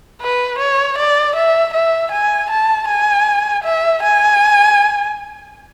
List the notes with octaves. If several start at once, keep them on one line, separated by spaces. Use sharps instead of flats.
B4
C#5
D5
E5
E5
G#5
A5
G#5
E5
G#5